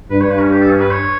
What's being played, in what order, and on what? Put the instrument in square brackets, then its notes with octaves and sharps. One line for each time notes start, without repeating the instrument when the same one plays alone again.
[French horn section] G2 [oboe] B4
[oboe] C#5
B4
C#4
G4
A4
C#4
B4
C#5